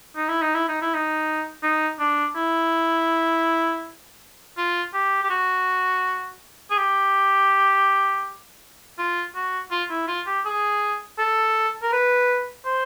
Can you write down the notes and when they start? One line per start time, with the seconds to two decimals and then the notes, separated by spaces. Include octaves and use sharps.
0.16 D#4
0.29 E4
0.42 D#4
0.55 E4
0.68 D#4
0.82 E4
0.95 D#4
1.63 D#4
2.00 D4
2.36 E4
4.57 F4
4.94 G4
5.23 G4
5.30 F#4
6.70 G#4
6.77 G4
8.98 F4
9.35 F#4
9.71 F4
9.90 E4
10.08 F4
10.27 G4
10.46 G#4
11.19 A4
11.82 A#4
11.93 B4
12.65 C5